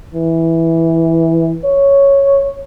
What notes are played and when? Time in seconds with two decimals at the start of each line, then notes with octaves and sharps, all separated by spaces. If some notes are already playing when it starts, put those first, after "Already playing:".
0.15 E3
1.64 C#5